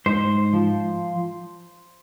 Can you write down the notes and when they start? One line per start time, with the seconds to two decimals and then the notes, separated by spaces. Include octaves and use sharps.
0.06 G#2 C5
0.53 F3